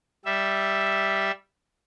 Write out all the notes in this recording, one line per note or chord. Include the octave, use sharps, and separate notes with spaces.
G3 E5